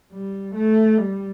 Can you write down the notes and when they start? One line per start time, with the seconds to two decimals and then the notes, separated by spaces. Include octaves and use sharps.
0.13 G3
0.55 A3
0.98 G3